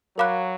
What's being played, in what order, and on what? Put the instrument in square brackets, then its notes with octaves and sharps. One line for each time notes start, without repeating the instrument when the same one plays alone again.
[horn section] F#3 [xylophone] A#4 F5 B5 D6 F#6